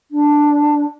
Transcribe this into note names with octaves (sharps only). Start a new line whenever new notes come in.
D4